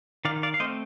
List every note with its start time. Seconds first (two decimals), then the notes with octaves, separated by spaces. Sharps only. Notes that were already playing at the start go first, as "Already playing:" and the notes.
0.25 D#3 D5 F5
0.43 D5 F5
0.54 F5
0.60 A3 C4 C5 D#5